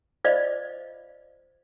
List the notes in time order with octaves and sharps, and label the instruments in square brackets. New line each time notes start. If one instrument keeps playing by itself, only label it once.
[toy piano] F4 C5 D5 D#5 F5